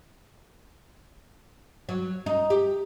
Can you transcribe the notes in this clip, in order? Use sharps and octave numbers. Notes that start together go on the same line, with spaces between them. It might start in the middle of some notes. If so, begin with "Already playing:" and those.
F#3
D#4
G4